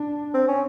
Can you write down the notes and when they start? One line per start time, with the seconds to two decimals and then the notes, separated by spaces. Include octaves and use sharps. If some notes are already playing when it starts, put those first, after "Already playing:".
Already playing: D4
0.34 C4
0.48 C#4